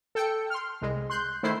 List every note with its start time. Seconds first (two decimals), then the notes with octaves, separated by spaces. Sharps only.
0.15 A4 G5 C#7
0.50 C6 F6
0.81 C2 G#3
1.10 C6 F#6 G6
1.43 D#3 A3 E4 C5 C7